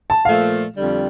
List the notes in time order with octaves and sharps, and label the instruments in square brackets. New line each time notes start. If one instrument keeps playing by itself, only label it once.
[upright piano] A5
[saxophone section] A#2 F3 A3 [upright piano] F5
[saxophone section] F2 D3 G3